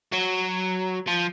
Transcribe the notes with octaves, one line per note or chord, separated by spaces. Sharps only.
F#3
F3